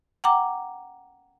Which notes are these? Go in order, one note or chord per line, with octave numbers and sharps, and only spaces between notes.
F#5 G5 A#5 D6